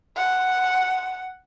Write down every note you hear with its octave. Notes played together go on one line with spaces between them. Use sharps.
F#5